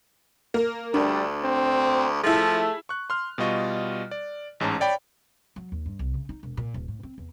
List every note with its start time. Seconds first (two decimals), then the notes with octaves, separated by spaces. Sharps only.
0.54 A#3 A#4
0.94 D2 G3 D4
1.43 C4
2.24 F3 A3 E4 G#4
2.89 C#6 F#6
3.10 C6 F6
3.38 B2 G3 F4 D#5 C#6
4.11 D5
4.60 A1 G#2 C#4 A5 A#5
4.80 C#5 D5 G5 B5
5.56 F#3
5.72 D#2
5.86 G2
5.99 C2
6.14 C#3
6.29 D#4
6.43 E1
6.57 A#2
6.74 D#1
6.88 A2
7.03 C4
7.18 E2